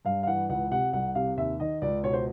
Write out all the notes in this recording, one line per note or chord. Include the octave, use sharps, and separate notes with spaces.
G2 F5
F5
E3 F#5
C#2 F#5
C3 F#5
C2 F#5
C3 F5
D#2 E5
D#3 D#5
C#2 D5
B2 C#5
C5